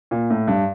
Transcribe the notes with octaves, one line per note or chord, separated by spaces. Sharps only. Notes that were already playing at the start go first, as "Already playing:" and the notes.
A#2
A2
G2